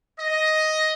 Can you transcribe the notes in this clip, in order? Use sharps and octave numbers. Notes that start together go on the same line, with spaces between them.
D#5